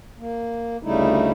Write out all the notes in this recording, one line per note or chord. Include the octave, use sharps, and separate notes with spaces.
A#3
D2 C#3 G3 A3 D#4 E4